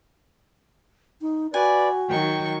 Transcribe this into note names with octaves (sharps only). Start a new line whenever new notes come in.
D#4
F#4 B4 D5 G#5
D#3 F#3 G5 C#6